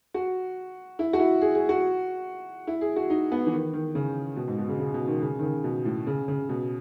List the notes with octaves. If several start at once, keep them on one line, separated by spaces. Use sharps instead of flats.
F#4
E4
F#4
E4
G#4
G#4
F#4
E4
G#4
F#4
D#4
B3
E3
D#3
D#3
C#3
B2
G#2
B2
C#3
C#3
B2
D#3
C#3
D#3
C#3
B2
A2
C#3
C#3
B2